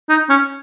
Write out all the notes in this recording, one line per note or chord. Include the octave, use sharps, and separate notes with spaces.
D#4
C#4